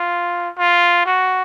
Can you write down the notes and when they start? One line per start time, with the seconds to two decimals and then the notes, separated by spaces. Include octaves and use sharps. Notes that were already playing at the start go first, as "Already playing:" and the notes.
Already playing: F4
0.58 F4
1.06 F#4